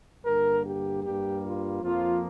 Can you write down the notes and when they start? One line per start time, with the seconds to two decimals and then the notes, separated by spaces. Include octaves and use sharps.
0.24 G2 D3 A#3 A#4
0.64 G4
1.03 G2 G3 A#3 G4
1.43 F4
1.82 F2 F3 A#3 F4